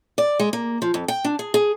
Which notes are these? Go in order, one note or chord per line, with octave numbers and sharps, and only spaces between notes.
D5
G#3
A#3
F3
F2
G5
D4
G#4
G#4